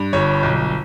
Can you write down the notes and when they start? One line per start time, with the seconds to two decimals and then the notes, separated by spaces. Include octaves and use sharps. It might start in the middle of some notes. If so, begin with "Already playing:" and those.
Already playing: G2
0.13 G1 C#5
0.43 B1